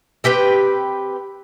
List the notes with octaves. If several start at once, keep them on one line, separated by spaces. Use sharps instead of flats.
C4 G4 B4 G5